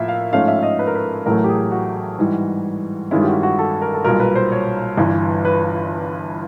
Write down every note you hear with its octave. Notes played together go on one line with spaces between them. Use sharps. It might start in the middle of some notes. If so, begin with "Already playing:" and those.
Already playing: A2 F3 A#3 E5
F5
G#2 F3 A3 C#4 F5
E5
E5
D#5
B4
A#4
B4
A1 A2 F#3 A3 A#4
G4
G#4
F#4
G#2 E3 G3
G2 D#3 G#3 C#4 E4 F4
G4
F#4
F#4
A4
A#4
A4
B1 A#2 G3 A#4
B4
C5
C#5
G1 G2 E3
B4